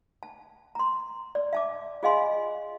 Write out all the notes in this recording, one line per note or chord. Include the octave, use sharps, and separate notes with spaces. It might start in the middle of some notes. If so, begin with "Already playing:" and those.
A5
A#5 C6
D5
E5 A5 D6
F4 G#4 D#5 F5 G#5 C6